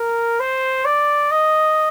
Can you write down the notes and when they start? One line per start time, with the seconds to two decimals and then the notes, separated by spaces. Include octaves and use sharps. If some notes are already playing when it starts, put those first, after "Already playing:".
Already playing: A#4
0.40 C5
0.85 D5
1.31 D#5